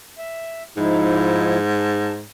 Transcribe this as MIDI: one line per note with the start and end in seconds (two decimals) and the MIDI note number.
0.18 0.63 76
0.77 2.24 44
0.77 1.57 53
0.77 1.57 63
0.77 1.57 64
1.81 2.12 81